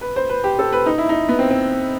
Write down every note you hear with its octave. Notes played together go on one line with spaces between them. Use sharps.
B4
C5
B4
G4
A4
B4
D#4
E4
D#4
B3
C4
C4